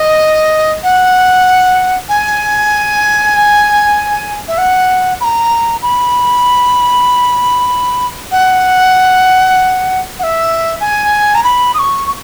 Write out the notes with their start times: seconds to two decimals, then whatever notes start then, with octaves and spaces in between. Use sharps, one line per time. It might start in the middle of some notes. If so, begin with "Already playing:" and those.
Already playing: D#5
0.83 F#5
2.09 G#5
4.48 E5
4.58 F#5
5.21 B5
5.24 A#5
5.82 B5
8.32 F#5
10.19 F#5
10.23 E5
10.81 G#5
11.35 A#5
11.44 B5
11.74 D#6
11.79 C#6
12.06 C#6